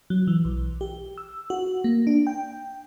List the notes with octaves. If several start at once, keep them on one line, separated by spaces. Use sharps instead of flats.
F#3
E3
B1
G4
E6
F#4
A#3
D4
G5